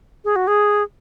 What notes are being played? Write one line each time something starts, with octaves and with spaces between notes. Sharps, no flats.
G#4
F#4
G#4